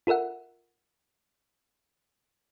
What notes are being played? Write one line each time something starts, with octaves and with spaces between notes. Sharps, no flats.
F4 A4 A#4 E5 F#5